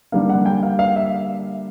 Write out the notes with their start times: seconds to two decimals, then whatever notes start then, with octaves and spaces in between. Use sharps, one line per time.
0.12 D3 G3 A#3 F5
0.29 F#5
0.46 G5
0.63 F5
0.79 F5
0.96 E5